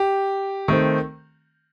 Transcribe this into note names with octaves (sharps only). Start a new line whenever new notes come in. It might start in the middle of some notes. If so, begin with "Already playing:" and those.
Already playing: G4
D#3 A3 C4